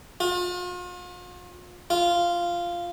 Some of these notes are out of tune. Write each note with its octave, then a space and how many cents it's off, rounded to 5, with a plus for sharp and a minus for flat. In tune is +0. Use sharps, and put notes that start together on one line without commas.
F4 +40
F4 -10